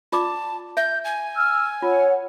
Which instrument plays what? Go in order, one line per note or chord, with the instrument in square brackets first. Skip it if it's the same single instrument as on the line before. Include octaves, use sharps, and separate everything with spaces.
[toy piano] F4 D5 D6 [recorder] A5
[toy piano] E5 [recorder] G6
[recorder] G#5
[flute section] E6 F6
[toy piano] F4 [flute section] C#5 F#5